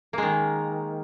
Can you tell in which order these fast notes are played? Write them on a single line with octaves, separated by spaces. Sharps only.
A#3 G#3 D#3